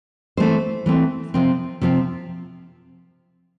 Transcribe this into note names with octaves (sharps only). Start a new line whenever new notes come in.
E3 A3 C4 C5
E3 A3 C4
C3 F3 C4
C3 F3 C4